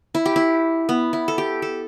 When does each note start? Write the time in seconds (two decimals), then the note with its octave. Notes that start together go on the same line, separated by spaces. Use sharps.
0.15 E4
0.26 G4
0.36 E4
0.89 B3
1.13 E4
1.28 A4
1.38 G4
1.62 A4